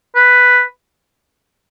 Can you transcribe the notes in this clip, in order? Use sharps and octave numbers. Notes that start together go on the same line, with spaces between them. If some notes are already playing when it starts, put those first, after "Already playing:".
B4